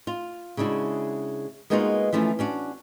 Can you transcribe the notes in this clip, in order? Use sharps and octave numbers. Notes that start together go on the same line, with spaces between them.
F4
C#3 G#3 D4 E4 F#4
G#3 A#3 B3 D#4 F4 F#4
E3 F3 A3 C#4 E4
C#4 D4 F#4